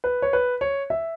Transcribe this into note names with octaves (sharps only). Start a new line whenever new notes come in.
B4
C#5
B4
C#5
E5